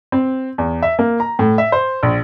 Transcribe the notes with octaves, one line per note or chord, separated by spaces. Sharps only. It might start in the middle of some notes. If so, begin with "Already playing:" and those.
C4
E2
E5
A#3
A#5
A2
E5
C5
A#1